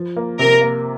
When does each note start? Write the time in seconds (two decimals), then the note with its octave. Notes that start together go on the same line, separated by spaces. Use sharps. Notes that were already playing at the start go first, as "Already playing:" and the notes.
Already playing: F3
0.16 A#3
0.39 C3 A#4
0.61 A#3